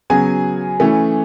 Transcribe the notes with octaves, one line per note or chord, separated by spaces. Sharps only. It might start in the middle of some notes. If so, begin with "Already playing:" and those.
C#3 F#3 B3 G#4 G#5
E3 A3 C#4